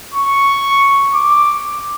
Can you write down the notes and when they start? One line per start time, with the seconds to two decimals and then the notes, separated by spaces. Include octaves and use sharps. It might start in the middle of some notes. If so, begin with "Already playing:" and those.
0.14 C#6
1.14 D6